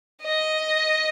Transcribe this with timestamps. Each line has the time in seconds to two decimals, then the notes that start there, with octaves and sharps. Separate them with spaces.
0.23 D#5